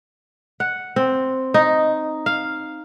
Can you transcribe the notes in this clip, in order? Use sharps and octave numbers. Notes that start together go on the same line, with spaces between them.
F#5
C4
D#4
F5